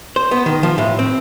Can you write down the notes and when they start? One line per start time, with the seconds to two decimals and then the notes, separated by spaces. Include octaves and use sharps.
0.16 C5
0.31 B3
0.46 D#3
0.63 F3
0.78 A2
0.99 C4